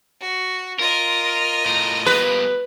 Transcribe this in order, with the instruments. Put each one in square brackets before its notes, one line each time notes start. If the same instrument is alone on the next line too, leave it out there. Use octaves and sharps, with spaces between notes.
[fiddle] F#4
[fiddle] F4 D#5 [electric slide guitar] A#4
[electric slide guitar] A2 A#4
[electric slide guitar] G3 A#3 B3 [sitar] B4